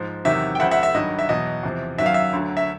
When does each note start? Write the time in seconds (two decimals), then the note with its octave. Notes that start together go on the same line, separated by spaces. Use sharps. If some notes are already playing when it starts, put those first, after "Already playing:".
Already playing: G#2 F3
0.25 E2 C3 D#3 F#3 E5
0.55 G5
0.60 C#2 C#3 F3 E5 F#5
0.71 E5 F#5
0.83 E5
0.94 G2 D#3 F#3 D#5
1.19 E5
1.29 E2 B2 F#3 D#5
1.63 E2 C3 F3
1.98 F#2 D#3 F#3 E5
2.06 F5
2.14 E5
2.33 D2 D3 F#3
2.57 E5